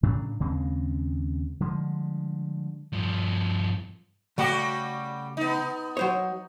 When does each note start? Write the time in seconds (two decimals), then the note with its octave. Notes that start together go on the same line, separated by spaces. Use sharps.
0.03 A2 C#3 F#3 D4
0.40 D#2 C#3 G#3 C4
1.60 D3 F3 G3 G#3
2.93 G2 F3
4.38 C#3 G3 A3 F#4 G4 F#5
5.37 B3 D#4
5.97 F#3 C5 C#5